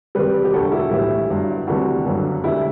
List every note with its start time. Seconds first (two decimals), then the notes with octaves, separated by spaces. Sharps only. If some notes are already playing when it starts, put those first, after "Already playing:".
0.15 E2 C3 G3 G4 B4
0.44 G4
0.53 E1 D2 D3 F#3 F#4 A4
0.72 E4 G4
0.91 B1 A2 E3 G3 E4 G4
1.30 G1 G2 F#3
1.67 D2 C3 E3 G3 D4 F#4
2.05 G1 F#2 D3 F#3
2.43 E1 D2 D3 E4 G4